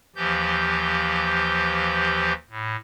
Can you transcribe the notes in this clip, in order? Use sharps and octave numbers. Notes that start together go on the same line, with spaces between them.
D#2 E3 F3 G4 G6
A2